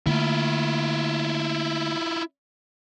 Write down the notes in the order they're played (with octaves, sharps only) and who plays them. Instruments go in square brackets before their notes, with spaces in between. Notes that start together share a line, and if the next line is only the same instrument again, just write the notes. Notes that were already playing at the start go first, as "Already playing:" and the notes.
[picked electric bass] D3 A3 A#3 [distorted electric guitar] E4 F4